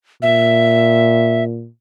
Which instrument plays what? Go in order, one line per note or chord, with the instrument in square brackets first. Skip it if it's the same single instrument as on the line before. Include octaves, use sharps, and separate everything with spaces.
[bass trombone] A#2 [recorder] E5